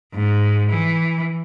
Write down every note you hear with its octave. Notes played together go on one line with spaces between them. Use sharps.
G#2
E3